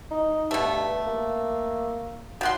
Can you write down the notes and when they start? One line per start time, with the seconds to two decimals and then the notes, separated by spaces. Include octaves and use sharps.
0.11 D#4
0.51 G2 B2 A3
1.07 A#3
2.41 D#3 F#4 F#5 C6